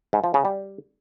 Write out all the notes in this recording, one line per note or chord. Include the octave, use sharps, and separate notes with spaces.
G#2
F3
C#3
G3